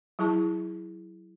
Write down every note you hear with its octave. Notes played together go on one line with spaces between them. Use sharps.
F#3 E4 G#4 A5 C#6